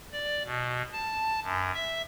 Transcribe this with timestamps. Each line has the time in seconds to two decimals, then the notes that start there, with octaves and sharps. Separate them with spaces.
0.12 D5
0.44 B2
0.93 A5
1.42 F#2
1.74 E5